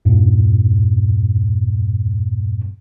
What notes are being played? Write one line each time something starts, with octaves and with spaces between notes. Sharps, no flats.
E2 G2 A#2